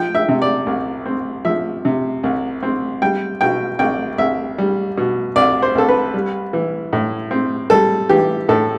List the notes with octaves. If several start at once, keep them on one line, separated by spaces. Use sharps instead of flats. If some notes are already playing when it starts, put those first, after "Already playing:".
Already playing: F3 G5
E5
C3
D5
C2
C4
F3 E5
C3
C2
C4
G3 G5
B2 G5
C2 G5
C2 E5
G3
B2
C2 D5
C5
C2 A4
B4
G3
E3
A2
C4
G3 A4
E3 G4
A2 A4